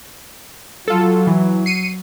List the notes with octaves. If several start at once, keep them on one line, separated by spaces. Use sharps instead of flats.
F#3 F4 A4
E3
C7 C#7 D#7